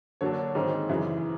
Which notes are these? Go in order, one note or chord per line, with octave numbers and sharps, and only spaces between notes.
D3 F#3 A#3 D4 C#5
G#2 D#3 G#3 C4
F#2 C#3 E3